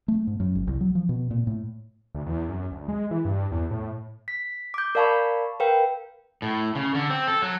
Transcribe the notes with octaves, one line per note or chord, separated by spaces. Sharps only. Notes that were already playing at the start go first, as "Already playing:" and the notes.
A3
G#2
F#2
G#1
C2
F#3
F3
B2
A#2
A2
D2
E2
F#2
D2
G#3
E3
G2
E2
A2
B6
D6 G6
A#4 D5 F5 A5 B5 C#6
A#4 B4 F5 G5
A2
C#3
D3
C4
A4
F#3